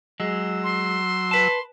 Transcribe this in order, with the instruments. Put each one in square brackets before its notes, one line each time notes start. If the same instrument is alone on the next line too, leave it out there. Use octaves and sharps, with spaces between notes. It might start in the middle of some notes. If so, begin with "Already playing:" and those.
[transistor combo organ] F#3 E6 [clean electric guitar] G#3
[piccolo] C6
[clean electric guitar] B4 A5